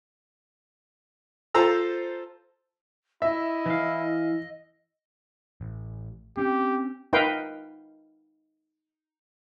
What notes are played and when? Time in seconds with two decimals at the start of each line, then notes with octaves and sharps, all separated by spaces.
1.54 F4 A4 C5 A#5 E6
3.22 E4 D#5 E5
3.66 E3 F5
5.61 A1
6.37 C4 C#4 G4
7.13 D#4 A#4 B4 F5 G5